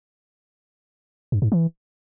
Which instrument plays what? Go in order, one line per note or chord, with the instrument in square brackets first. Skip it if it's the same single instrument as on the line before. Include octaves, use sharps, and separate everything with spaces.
[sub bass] G2
G#2
E3